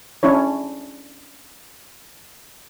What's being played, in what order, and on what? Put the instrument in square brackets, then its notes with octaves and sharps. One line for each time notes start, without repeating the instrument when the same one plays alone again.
[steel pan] C#4 D4 E4 C#5